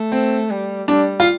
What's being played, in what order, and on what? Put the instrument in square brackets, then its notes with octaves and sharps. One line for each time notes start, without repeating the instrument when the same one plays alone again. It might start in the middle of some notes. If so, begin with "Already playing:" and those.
Already playing: [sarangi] A3
[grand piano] C4
[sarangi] G3
[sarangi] G3 [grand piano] D4
[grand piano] F4